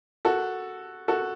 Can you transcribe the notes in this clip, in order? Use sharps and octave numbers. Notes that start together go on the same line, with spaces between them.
F#4 A4
F#4 A4